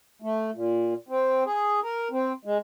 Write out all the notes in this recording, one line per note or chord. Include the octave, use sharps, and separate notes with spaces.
A3
A#2
C4
G#4
A#4
C4
G#3